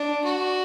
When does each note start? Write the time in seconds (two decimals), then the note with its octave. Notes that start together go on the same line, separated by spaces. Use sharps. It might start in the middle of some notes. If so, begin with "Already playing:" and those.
Already playing: D4
0.25 F#4